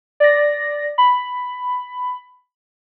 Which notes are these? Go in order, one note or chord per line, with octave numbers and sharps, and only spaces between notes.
D5 A#6
B5